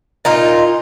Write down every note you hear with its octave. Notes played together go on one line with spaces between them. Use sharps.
A#2 D#4 F4